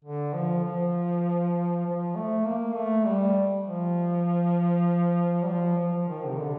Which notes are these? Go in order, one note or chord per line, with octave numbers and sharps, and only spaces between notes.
D3
F3
F3
F3
A3
A#3
A3
G3
F3
G3
F3
F3
D#3
C3
D3